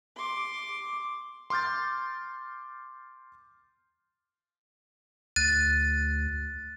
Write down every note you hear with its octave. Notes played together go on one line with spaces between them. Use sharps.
C6 D6
C6 D6 F6 G6 A6
D2 F#6 A6 D#7